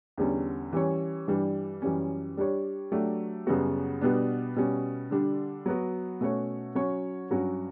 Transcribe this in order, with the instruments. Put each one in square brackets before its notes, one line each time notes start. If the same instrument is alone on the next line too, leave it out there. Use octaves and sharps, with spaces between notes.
[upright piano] E2 D3 G3 C#4
E3 G3 C#4 G4 C#5
G2 E3 G3 D4 G4
F#2 E3 G3 C#4
G3 D4 G4 C#5
F#3 A3 D4 G4
F#2 C#3 G3 B3 F#4
B2 G3 B3 D4
B2 G3 C#4
D3 G3 D4
F#3 B3 F#4
B2 A3 C#4 F#4 C#5
F#3 C#4 F#4 C#5
G2 F#3 C#4 F#4